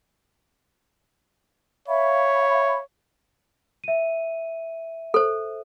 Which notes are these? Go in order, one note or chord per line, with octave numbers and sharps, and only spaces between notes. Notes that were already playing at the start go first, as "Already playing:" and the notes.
C#5 E5 F5 B5
E5 D#7
A4 C5